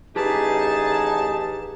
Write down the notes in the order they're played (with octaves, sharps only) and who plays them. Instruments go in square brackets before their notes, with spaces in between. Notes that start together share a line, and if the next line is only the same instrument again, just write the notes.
[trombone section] A1 D#4 G#4 [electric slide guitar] G4 B4 [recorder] A5